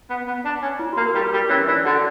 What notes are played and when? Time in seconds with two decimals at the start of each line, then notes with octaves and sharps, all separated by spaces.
0.10 B3
0.27 B3
0.45 D4
0.62 C#4
0.79 E4
0.93 F#4
0.97 A#3
1.06 A#4
1.15 G3
1.20 G4
1.32 G3 A#4
1.49 E3 C#4 C#5
1.67 E3 D4 D5
1.85 D3 F#4 F#5